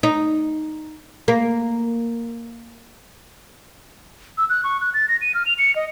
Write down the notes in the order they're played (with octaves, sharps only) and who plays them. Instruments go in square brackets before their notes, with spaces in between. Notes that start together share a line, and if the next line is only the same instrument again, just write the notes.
[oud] D#4
A#3
[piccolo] E6
F#6
C#6
F#6
A6
A#6
D#7
F6
F7
C#7
D#5